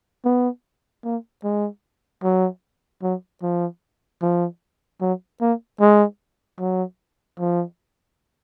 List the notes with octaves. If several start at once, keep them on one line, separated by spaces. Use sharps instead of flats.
B3
A#3
G#3
F#3
F#3
F3
F3
F#3
A#3
G#3
F#3
F3